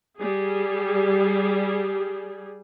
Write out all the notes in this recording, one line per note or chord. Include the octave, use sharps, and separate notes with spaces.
G3 G#4